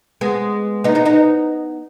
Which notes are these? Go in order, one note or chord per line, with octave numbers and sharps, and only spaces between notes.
G#3 B3
B3 D#4
B3 D#4
B3 D#4